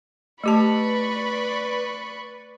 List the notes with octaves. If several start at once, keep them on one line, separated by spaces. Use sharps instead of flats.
A3 G4 B4 D5 A5 B5 C#6